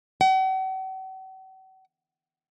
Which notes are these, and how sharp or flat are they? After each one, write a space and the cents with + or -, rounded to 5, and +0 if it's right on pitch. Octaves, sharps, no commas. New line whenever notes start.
F#5 +45